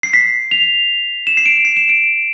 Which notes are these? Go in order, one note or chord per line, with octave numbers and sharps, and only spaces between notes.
C7
B6
F7
E7
C7
D7
C7
E7
D7